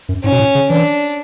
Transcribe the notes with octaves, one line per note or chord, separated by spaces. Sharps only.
F#2
G#2 C#4
B2
A2
C#3
E3 D4